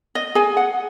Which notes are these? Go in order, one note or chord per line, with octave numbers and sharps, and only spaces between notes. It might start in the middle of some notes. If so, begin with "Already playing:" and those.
D#5
G#4 G#5
F#5